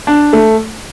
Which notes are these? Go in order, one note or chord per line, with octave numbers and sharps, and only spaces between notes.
D4
A3